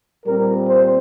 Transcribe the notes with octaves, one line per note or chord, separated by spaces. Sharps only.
A#2 G3 C4 A#4
C5